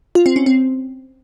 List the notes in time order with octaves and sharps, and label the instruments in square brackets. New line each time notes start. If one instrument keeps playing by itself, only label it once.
[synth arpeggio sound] F4
C4
C#4
C4